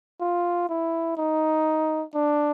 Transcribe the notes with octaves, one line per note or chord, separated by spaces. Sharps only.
F4
E4
D#4
D4